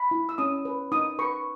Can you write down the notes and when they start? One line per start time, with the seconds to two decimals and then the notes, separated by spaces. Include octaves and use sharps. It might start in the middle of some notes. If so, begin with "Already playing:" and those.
Already playing: B5
0.11 E4
0.29 E6
0.38 C#4 D#6
0.65 B4
0.92 D#4 D#6
1.19 B4 C#6